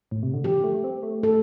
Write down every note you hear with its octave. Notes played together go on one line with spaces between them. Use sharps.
A2
C3
D3
F3 G4
A3
A3
C4
A3
A4